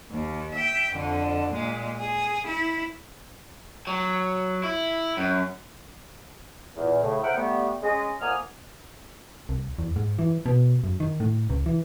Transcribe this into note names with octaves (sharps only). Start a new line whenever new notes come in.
D#2
E5 G5
F2 D3
A#2 G#3
G#4
E4
F#3
E4
F#2
E2 A#2
A2 C#3
A#4 C5 E5 F#5 G5
G3 A3 B3
G#3 C#4 D#5
F2 A#3 F#5 G#5 D#6 F6
C2
E2
G#2
E3
B2
F#2
D#3
A2
C#2
E3